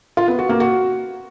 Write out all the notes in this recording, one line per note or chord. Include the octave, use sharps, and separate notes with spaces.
F4
B3
F#4
A#3
F#4